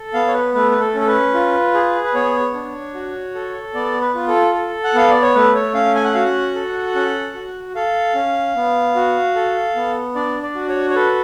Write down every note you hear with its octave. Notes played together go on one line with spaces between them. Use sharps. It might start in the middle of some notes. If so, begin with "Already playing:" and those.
Already playing: A4
B3 F5
C#5
B4
A3 B4
B4
A4
C#4
A4
B4
F4
G#4
B4
B3 C#5
D4
F#4
A4
B3 D5
B4
F4
A4
A4
F#5
B3 F5
D5
C#5
A3 B4
C#5
C#4 F5
G#5
F#5
F#4 F5
F#5
A4
C#4
F#4
A4 F5
C#4
B3
F#4
A4
B3
D4 D5
D5
F#4
C#5
C#5
A4 B4